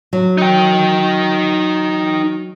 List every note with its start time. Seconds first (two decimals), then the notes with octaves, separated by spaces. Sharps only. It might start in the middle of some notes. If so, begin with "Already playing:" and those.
0.13 F#3
0.38 D#4 G5